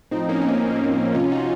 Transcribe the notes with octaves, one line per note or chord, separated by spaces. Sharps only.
A2 F3 C4 D#4
A#3 C#4
C#4
C4 D#4
C3 F3 C#4 F4
D#4 F#4